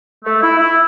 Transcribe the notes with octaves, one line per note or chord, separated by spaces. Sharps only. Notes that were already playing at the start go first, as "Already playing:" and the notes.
A3
E4
E4